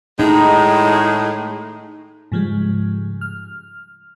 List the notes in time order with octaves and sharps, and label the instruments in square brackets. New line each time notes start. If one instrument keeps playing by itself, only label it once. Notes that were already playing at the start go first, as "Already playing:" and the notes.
[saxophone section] A2 G#3 [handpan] D#4
[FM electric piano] G#2 C#3 F3 G3 G#3
F6